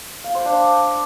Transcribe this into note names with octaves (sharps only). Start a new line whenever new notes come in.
F5
C5
D4